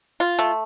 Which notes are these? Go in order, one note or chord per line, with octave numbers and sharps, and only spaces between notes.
F4
A3